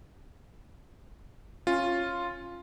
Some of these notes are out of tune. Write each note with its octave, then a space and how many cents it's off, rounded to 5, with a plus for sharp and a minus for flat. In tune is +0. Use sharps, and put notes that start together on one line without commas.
C#4 -15 F4 +0